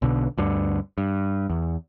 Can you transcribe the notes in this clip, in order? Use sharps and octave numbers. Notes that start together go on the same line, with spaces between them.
B1 B2 D3
D2 G2 D3
G2
E2